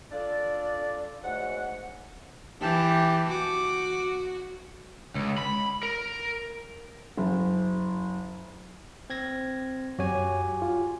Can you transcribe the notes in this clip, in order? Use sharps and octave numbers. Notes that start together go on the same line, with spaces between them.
D4 F4 A4 D5
G#2 F#3 A3 F#5
E3 G4 A5
F#4 D6
C#2
B5
A#4
F#1
C4 G#6 A#6
F#2 F#4 G4 C#5 G#5
F4